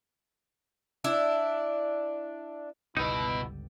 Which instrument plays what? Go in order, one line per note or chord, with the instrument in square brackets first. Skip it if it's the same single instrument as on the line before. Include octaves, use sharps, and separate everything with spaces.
[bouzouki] D4 E4 E5
[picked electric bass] G1 C#2 G3 [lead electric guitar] B2 B4 [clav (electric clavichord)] D#4 [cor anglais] E4